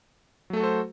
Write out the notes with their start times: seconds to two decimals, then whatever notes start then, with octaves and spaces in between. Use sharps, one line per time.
0.50 F#3
0.53 A3
0.57 A4
0.60 F#4
0.63 C5